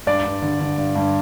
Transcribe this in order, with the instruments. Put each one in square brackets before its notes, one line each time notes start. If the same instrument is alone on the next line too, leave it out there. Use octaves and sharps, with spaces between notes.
[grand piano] G2 D5
G2
D3
D3
G2
G2